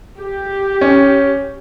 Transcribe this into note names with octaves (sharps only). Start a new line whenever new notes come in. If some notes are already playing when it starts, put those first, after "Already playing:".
G4
C#4